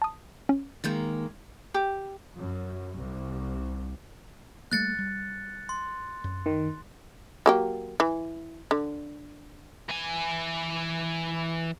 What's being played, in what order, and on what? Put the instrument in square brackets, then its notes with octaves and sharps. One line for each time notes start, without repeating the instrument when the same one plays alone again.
[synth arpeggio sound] A5 D#6
C#4
[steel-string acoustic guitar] D#3 G#3 A#3 [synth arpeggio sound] G6 A6
[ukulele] G4
[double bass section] F#2
C2
[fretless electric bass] G3 A3 A#3 [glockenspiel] F#6 A6 C#7
[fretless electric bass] G3
[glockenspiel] C6
[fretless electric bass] F#2
[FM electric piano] D#3
[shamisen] F#3 A#3 G4
E3
D3
[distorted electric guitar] E3 G#5